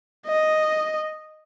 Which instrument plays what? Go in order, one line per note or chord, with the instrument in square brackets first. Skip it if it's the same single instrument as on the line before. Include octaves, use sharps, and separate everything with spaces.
[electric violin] D#5